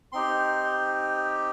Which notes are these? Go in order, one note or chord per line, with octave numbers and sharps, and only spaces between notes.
C4 D#4 G4 C6